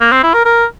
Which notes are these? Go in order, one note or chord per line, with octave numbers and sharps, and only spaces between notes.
A#3
C4
E4
A#4
A#4